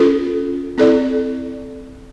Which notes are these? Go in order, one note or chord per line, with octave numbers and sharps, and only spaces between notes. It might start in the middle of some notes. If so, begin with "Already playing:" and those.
Already playing: C#4 F4 A4
C4 E4 A4 D5